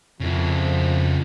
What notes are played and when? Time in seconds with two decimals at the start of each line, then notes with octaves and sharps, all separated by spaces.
0.20 F2 C#3 F3 E4